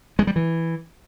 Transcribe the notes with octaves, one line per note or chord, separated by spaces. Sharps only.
G#3
G3
E3